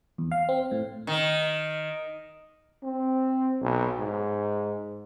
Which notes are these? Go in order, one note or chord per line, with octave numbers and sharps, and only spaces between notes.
E2
F5
C4
A2
D#3
C4
B1
G#2